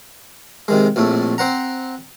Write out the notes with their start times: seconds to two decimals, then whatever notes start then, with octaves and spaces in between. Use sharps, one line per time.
0.68 C3 D#3 G#3
0.96 A#1 F2 A2 A3
1.38 C4 C5 F#5 A#5